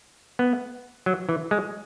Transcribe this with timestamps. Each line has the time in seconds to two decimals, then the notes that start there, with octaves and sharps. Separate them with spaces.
0.39 B3
1.06 F#3
1.29 E3
1.51 G#3